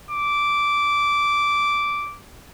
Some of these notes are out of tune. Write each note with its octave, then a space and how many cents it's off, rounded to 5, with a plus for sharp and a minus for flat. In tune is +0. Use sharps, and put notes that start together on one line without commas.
D6 -10